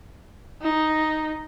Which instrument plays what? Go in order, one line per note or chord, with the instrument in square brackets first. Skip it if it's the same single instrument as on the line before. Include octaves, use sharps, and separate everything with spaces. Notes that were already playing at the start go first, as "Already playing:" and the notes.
[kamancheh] D#4